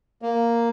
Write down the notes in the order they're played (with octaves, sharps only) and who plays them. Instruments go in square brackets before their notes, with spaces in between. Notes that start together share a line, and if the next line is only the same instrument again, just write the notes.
[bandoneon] A#3